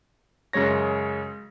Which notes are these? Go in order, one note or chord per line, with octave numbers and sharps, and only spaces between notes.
F#2 C#3 G#3 C#5 A#6